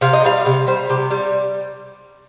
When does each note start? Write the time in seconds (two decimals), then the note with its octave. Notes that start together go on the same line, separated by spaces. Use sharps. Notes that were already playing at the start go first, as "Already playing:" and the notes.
0.01 C3 F5
0.13 D#5
0.24 G3 F5
0.46 C3
0.67 G3 C5
0.89 C3 G4
1.11 G3